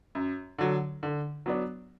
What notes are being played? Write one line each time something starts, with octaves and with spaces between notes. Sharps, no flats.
F#2
D3 F#3
D3
F#3 B3 D4